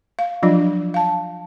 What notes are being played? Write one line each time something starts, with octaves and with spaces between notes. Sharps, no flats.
F5
F3 F#3 D4 F4
F5 A5